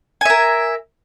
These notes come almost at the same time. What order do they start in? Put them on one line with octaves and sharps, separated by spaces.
G#5 E5 A#4